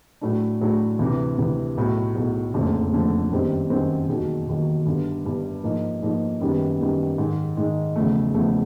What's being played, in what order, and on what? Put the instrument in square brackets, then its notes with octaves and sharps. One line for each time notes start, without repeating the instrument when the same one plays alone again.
[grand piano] A2 F#3 A3 D4
A2 F#3 A3 D4
D2 C3 E3
D2 C3 E3
B1 A2 F#3
B1 A2 F#3
F#1 F2 D3 F3 A3
F#1 F2 D3 F3 A3
G1 F#2 D#3 G3 C4
G1 F#2 D#3 G3 C4
E1 D#2 D#3 F#3
E1 D#2 D#3 F#3
G1 G2 D3
G1 G2 D3
G#2 F3 A#3 D#4
G#2 F3 A#3 D#4
F#2 D#3 G3 B3
F#2 D#3 G3 B3
G#2 D#3 G#3
G#2 D#3 G#3
E1 E2 C#3 F3 A3
E1 E2 C#3 F3 A3